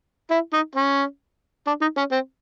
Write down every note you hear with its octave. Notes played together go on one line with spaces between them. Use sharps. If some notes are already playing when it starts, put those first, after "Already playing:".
E4
D#4
C#4
D4
D#4
C#4
C4